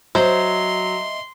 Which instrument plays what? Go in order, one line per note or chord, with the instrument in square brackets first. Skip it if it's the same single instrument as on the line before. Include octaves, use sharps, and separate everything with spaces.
[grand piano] F#3 [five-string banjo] C5 [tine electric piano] D#5 E5 [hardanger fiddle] C6